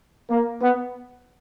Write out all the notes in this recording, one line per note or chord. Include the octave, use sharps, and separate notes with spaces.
A#3
B3